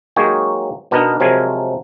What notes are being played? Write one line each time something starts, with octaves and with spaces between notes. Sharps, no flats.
F#3 G#3 A#3 D#4 G4 C#5
B2 B3 D4 D#4 A#4
C3 F3 F#3 G#3 A#4 G#5